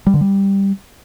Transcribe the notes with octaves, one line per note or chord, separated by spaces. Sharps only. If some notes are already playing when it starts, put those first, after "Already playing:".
G3
D3
G3